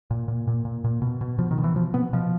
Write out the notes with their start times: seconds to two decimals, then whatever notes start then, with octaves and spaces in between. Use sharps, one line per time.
0.11 A#2
0.28 A#2
0.47 A#2
0.65 A#2
0.84 A#2
1.02 B2
1.21 B2
1.38 B2 F3
1.51 D#3
1.58 B2
1.64 E3
1.76 B2 F3
1.94 B2 B3
2.13 B2 F3